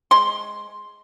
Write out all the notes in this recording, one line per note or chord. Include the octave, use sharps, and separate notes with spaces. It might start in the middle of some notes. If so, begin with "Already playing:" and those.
G#3 C6